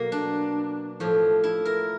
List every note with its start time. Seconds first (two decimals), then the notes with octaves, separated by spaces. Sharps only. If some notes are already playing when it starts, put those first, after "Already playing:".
Already playing: B2 F#3 A#3
0.12 D4
1.00 A2 F3
1.44 E4
1.65 A#4